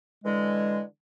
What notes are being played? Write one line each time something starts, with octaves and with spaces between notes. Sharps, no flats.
D3 E3 G#3